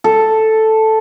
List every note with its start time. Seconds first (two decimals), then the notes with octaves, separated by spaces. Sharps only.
0.04 A4